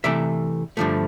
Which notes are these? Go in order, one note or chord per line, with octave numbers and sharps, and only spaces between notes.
C3 E3 A3 D5 E5
G2 D3 F3 A3